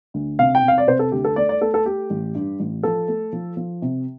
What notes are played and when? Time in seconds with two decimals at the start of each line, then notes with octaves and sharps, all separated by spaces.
0.14 D2
0.39 C3 F5
0.55 G5
0.63 C3
0.68 F5
0.78 D5
0.87 C3 C5
0.99 A4
1.12 D2 G4
1.24 A4
1.36 A3 D5
1.49 D5
1.61 A3 A4
1.74 A4
1.86 A3 G4
2.10 A1
2.35 G2
2.59 A1
2.83 F3 A4
3.08 A3
3.33 F3
3.57 F3
3.82 C3